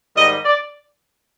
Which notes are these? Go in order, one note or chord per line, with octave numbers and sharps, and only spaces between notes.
G#2 D#3 G3 D#5
D5